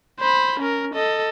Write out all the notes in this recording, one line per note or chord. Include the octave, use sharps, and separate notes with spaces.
C5 B5
C#4 A#4
A4 D#5